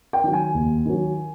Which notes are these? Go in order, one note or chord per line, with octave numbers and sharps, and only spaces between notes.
G5
D#3 F#3
G#5
D#2
D#3 F#3